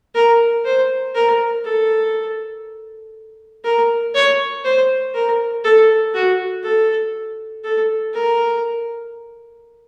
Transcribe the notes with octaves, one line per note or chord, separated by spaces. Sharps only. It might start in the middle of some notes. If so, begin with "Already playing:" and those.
A#4
C5
A#4
A4
A#4
C#5
C5
A#4
A4
F#4
A4
A4
A#4